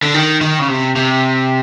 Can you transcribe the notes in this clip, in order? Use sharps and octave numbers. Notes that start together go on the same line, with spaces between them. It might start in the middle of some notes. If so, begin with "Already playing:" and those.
D3
D#3
D#3
C#3
C3
C3